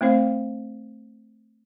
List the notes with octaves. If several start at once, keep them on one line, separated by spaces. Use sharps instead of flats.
A3 C4 E4 C5 F5